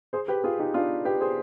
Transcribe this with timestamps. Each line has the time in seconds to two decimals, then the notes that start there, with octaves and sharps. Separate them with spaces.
0.13 G#4 C5
0.28 G4 B4
0.44 F4 G#4
0.59 D#4 G4
0.74 D4 F4
1.05 G4 B4
1.21 G#4 C5